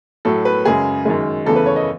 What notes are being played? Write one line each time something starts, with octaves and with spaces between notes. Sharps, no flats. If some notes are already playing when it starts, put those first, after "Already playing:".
A2 F#3 A3 A4
B4
F#2 C#3 G#3 G#4
F#2 D#3 G#3
E2 C#3 E3 A3 A4
B4
C#5
D#5